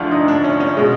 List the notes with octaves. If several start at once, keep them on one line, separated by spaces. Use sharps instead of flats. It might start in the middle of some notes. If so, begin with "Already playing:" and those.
Already playing: D2 D3 F3 D4 E4 F4
D#4
D4
C#4
C#4
B2 G#3